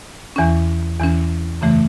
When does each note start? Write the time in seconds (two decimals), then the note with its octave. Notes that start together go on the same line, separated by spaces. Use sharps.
0.36 E2 E3 C#4
0.99 E2 E3 C#4
1.61 F#2 C#3 E3 A3